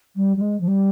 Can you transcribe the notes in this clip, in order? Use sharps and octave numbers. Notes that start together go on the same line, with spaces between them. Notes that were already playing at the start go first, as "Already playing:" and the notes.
G3
G3
G#3
F3
G3